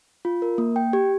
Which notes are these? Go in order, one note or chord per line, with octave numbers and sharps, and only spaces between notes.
F4
A#4
A#3
G5
G4